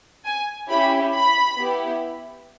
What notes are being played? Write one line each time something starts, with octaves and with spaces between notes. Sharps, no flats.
G#5
C#4 E4 G4 B5
B5
B3 E4 G4